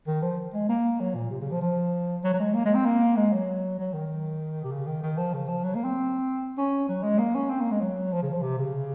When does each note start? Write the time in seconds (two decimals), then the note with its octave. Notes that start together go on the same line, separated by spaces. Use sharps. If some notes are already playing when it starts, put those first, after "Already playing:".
0.07 D#3
0.23 F3
0.54 G#3
0.69 A#3
1.00 F#3
1.15 A#2
1.31 C3
1.41 C#3
1.52 F3
1.62 F3
2.24 F#3
2.34 F#3
2.40 G#3
2.54 A#3
2.66 G#3
2.75 C4
2.86 A#3
3.17 G#3
3.33 F#3
3.79 F#3
3.94 D#3
4.64 C3
4.71 C#3
4.87 D#3
5.03 D#3
5.18 F3
5.34 C#3
5.48 F3
5.64 F#3
5.75 A#3
5.84 C4
6.58 C#4
6.89 F#3
7.03 G#3
7.19 A#3
7.35 C#4
7.50 C4
7.61 A#3
7.71 G#3
7.81 F#3
8.12 F3
8.23 C#3
8.33 F3
8.43 C3
8.58 C#3